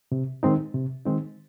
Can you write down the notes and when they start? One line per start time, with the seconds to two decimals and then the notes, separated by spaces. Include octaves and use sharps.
0.12 C3
0.43 D#3 G#3 C4 D#4
0.74 C3
1.05 D#3 G#3 C4 D#4